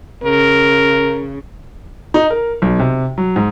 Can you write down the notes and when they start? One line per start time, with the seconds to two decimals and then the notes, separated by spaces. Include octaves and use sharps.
0.23 C#3 A#4
2.14 D#4
2.30 A#4
2.62 B1
2.79 C3
3.18 F#3
3.36 G#2